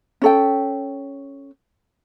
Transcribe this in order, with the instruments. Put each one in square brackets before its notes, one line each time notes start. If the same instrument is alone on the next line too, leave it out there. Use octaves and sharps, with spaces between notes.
[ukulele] C#4 A4 G5